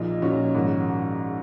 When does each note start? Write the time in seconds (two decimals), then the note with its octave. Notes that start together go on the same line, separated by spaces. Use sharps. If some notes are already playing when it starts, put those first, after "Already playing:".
Already playing: A#1 A#2 D#4
0.22 A#1 A#2 C#4 F#4
0.54 A#1 G#2 D#3